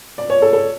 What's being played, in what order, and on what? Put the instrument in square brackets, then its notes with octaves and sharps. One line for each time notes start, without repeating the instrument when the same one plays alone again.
[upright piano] D5
C#5
A4
A4